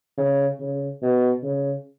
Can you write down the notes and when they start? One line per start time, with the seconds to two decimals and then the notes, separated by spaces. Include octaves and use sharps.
0.18 C#3
0.60 C#3
1.02 B2
1.43 C#3